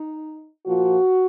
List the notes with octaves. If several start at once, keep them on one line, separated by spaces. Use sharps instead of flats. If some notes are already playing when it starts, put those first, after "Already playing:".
Already playing: D#4
A#2 F3 F#4